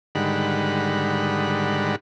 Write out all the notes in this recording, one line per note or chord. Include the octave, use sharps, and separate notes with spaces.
G#2 D3 D#3 G3 F#5 B5